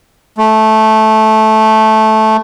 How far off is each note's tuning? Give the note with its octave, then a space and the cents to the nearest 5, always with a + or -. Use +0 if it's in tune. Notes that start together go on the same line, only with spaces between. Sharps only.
A3 -10